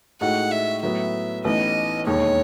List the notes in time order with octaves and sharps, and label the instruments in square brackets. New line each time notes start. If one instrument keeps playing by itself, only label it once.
[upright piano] A2 G#3 D#4 F#4 [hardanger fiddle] F#5
[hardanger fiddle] E5
[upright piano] A2 F#3 B3 E4 [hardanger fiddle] E5
[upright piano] A1 A2 E3 B3 D#4 [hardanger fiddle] D#5
[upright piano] E1 D#2 D#3 [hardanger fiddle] C#5